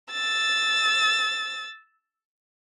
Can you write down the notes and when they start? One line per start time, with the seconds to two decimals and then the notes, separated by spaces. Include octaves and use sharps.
0.12 E6 A6